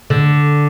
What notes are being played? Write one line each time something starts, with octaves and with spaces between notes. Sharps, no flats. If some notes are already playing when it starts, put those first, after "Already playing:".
D3